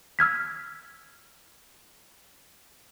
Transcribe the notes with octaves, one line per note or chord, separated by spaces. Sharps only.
E6 F6 G#6 B6